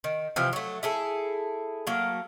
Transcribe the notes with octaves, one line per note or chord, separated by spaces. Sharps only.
D#3
C3 E3 F3 G4
F#3 A3
E4 G#4 A4
F#3 A3 A#3